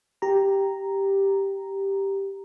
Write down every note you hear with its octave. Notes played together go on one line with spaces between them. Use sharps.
G4 A#5